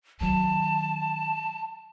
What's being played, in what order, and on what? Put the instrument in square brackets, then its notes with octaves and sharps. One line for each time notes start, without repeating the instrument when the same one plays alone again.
[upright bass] D#3 F#3 [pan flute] A5